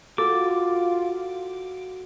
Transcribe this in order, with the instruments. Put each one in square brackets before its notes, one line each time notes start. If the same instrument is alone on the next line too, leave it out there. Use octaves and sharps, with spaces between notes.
[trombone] F4 [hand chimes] F#4 [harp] A4 [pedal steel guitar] D6